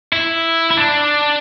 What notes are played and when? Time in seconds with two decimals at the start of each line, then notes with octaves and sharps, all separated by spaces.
0.13 E4
0.71 E4
0.78 D4